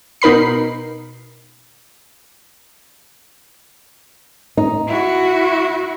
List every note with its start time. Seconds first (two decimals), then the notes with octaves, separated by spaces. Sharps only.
0.22 B2 D#4 A#4 B5 C7
4.57 D#4
4.87 E4 F#4